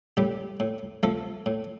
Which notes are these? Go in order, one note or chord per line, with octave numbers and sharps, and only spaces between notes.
A2 G3 G4
A2
F3 A3 A4
A2